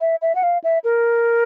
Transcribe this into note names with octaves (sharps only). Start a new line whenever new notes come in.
E5
E5
F#5
F5
E5
A#4